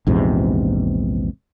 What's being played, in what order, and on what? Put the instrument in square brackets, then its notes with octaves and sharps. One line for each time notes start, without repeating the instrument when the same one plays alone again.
[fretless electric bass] A#1 E2 G#2 C3